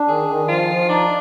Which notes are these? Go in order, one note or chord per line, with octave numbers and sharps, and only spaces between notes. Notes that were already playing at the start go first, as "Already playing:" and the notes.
Already playing: D4
D#3 G#4
D#3
F3 F4
F3
D4 D#4